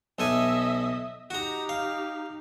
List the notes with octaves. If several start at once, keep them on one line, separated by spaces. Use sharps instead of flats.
B1 A4 D#5 E5 G#5
D#4 F#4 G4 A#5
F5